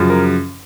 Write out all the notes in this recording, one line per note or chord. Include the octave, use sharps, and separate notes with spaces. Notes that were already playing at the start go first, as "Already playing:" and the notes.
Already playing: F#2 C#3 F3
A#4